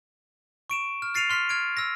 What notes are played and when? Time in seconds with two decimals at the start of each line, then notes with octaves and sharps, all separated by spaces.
0.70 C#6 D7 E7
1.02 F6
1.14 F6 A6 C7 C#7 D#7 F7
1.30 C6 F6 B6 C7
1.49 F6 G#6 D7
1.77 E6 A#6